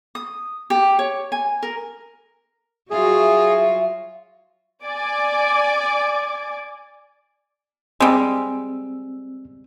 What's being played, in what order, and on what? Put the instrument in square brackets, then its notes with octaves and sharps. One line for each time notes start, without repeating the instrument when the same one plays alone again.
[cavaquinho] D#6
G4
C#5
G#5
A#4
[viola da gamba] F#3 F4 F#4 [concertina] G#4 [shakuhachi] E5
[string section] D5 G#5 D6
[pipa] G3 G#3 [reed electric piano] C4 E6